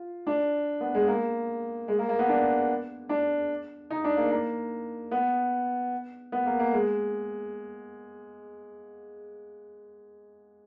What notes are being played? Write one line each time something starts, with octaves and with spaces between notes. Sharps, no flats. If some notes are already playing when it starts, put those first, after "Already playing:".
Already playing: F4
D4
B3
G#3
A#3
G#3
A#3
A#3
B3
D4
D4
D#4
D4
A#3
A#3
B3
B3
A#3
A#3
G#3